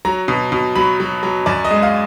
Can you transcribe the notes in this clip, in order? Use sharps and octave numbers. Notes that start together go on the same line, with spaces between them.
F#3 A#5
B2
B2
F#3 B5
F#3
F#3
F#2 D5
D#5
G#3
F5